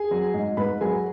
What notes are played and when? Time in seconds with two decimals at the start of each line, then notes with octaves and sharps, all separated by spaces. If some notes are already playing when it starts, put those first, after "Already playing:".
Already playing: G#4 G#5
0.11 F#3
0.34 G#2
0.57 G#2 B4 B5
0.81 F#3 G#4 G#5